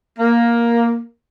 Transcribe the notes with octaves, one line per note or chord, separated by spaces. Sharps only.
A#3